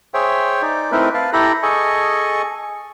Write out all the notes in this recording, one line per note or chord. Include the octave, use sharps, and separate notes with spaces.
G#4 C5 C#5 E5 G5
D#4 D5
A3 C4 D#4 E4 A#4 B4
B4 F5 A5
E4 G4 A4 A#5 B5
G#4 A4 D#5 G#5 C#6